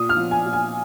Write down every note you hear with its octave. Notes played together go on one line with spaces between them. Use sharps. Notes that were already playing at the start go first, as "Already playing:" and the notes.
Already playing: A#2 D#6
F6
F3
G#5
A#2
G#5